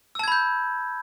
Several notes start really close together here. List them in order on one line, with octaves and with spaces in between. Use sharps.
E6 A5 G#6 B5 G6